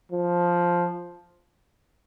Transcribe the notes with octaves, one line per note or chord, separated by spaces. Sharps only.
F3